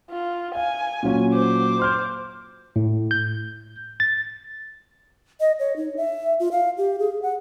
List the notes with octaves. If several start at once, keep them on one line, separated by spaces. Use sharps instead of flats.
F4
F5 G#5
A#2 F#3 C#4
C5 D6
C6 F6 G6
A2
G6
A6
D#5
C#5
D#4
E5
F4
F5
G4
G#4
F#5